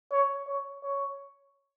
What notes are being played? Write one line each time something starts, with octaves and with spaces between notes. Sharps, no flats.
C#5
C#5
C#5